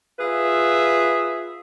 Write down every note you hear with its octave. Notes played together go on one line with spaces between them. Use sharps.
F4 G#4 B4 E5